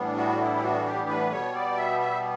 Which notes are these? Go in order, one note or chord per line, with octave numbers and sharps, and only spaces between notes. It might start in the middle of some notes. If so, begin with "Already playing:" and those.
Already playing: A2 E3 G3 B3 D4
F#4
E4
G4
F#4
G4
B4
B2 G3 B3 C#5
D5
E5
E5